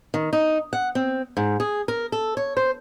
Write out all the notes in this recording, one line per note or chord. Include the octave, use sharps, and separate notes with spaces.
D#3
D#4
F#5
C4
G#2
G#4
A#4
A4
C#5
C5